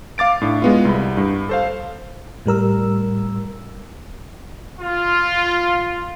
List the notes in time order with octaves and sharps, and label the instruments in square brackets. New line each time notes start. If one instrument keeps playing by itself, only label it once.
[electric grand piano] F5 D6 A6 D7
A2 D4
G#3 B3 F4
C2 B5
G2
A4 C5 F5
[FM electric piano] A2 G3 A#4 E6
[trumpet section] F4